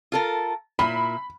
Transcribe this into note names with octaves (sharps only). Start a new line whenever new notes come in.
F4 A4 A#4
A#2 E4 B5